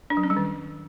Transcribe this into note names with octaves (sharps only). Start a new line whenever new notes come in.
D4
F#3
C#4
G3
D#3